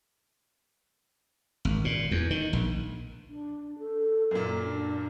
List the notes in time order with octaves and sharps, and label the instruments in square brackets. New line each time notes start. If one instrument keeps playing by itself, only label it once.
[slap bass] G#1
A#2
E2
D#3
A#1
[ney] D4
A4
[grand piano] F#2 A#2 [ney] A#4
[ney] D4